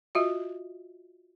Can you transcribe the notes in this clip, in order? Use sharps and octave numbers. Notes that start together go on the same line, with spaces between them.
F4 F#4 D#5 E5